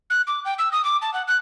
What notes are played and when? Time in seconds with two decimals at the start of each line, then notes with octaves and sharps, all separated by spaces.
0.10 F#6
0.27 D6
0.45 G5
0.59 E6
0.72 D#6
0.85 D6
1.02 A5
1.13 F#5
1.28 F#6